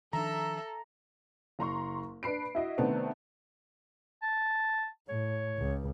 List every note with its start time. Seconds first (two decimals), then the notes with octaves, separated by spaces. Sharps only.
0.13 D#3 F3 D4 A4 E5 A#5
1.59 F#1 A#5 C6 C#6
2.23 D4 B4 B5 C7 D7
2.55 E4 F#4 D#5 E5
2.78 C3 D#3 A3 B3 C4 D4
4.22 A5
5.08 A2 C#5
5.58 C#2